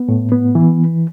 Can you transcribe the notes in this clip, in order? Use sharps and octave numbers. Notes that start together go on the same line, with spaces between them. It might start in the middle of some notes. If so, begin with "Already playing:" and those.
Already playing: B3
A2
B3
E3